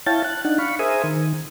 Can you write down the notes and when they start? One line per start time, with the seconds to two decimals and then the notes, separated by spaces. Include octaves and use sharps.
0.06 E4 C#5 F5 G5 A5 A6
0.24 F#6
0.45 D4 D#4 F#5
0.58 F5 B5 C#6
0.79 G#4 A#4 C5 E5 G#5 D#6
1.04 D#3